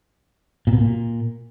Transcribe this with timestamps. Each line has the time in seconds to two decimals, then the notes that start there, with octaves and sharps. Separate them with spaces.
0.67 A#2
0.73 B2
0.78 A#2